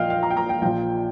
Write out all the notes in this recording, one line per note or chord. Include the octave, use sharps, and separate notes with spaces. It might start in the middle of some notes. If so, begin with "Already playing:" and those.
Already playing: A#1 A#2 F3 D#5 F5 G5
F5
A#5
G5
A#5
G5
A#1 A#2 F3 G5